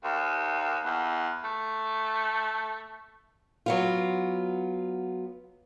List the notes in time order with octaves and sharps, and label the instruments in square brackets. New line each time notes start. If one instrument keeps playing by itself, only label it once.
[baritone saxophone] D#2
E2
A3
[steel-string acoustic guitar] F#3 B3 F4